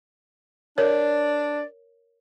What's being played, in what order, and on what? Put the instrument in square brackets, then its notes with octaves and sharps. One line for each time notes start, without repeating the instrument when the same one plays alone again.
[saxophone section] D4 D5 [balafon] A#4 C#5